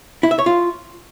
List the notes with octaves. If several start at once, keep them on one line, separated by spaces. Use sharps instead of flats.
E4
E5
C#5
F4